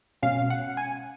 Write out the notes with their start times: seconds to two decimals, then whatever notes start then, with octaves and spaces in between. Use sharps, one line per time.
0.22 B2 G#3 C#4 F5
0.50 F#5
0.77 G#5